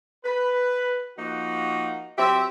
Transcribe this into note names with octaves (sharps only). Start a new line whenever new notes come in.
B4
F3 A#3 D#4 F#4
F#3 C4 G4 E5